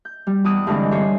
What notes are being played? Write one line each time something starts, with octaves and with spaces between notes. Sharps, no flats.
G6
G3
E2 D6 D#6 F#6
G2 D3 E3 G#3 C4
G3 D4 C5 C#5